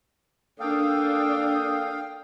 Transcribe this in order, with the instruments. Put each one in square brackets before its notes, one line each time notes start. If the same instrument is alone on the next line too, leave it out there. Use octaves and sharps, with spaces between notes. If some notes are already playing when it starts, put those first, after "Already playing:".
[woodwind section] A#3 D#6 [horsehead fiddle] D4 [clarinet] A4 [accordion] F5 G5